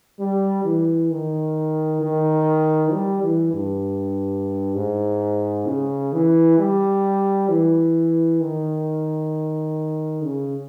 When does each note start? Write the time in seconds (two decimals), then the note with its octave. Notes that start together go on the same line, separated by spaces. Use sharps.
0.20 G3
0.64 E3
1.11 D#3
2.02 D#3
2.92 G3
3.23 E3
3.54 G2
4.75 G#2
5.67 C#3
6.13 E3
6.59 G3
7.49 E3
8.41 D#3
10.23 C#3